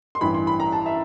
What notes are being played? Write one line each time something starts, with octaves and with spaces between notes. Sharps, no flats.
C6
A1 G2 E3 B5
C6
B5
A#5
A5
E5